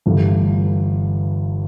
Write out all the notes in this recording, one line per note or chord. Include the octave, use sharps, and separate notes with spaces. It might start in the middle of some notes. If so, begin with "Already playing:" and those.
G1 G2 E3 A3